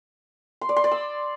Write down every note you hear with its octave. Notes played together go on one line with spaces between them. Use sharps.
C6
D5
C6
D5
E6